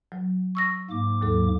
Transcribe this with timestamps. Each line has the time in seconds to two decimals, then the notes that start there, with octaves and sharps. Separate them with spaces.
0.12 F#3
0.55 C#6 E6 A#6
0.90 G#2 A#3 D6
1.21 D#2 F#3 A4